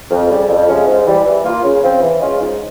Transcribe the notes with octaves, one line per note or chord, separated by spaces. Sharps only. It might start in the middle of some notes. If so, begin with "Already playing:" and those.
F2
C#3 G3
F2
C3 F3 G#3 C#4
G#2
E3 G3
E3
A#3 F4
C#3
F3 C4
E3
G#3 C#4 F4
G#2